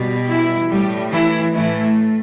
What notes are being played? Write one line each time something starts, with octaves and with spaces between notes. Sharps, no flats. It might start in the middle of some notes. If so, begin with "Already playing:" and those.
Already playing: B2 G3
E3 E4
A2 G3 A3 G4
E3 E4
A2 E3 A3 E4